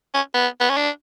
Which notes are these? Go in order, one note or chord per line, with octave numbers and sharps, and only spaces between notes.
C#4
B3
B3
C#4
D4